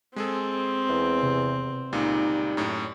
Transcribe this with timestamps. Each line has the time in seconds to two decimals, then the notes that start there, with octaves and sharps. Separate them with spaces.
0.16 G#3 C4 G#4 A4
0.89 E2
1.22 C3
1.93 C#2 A#2 G3 D#4
2.57 F#2 A2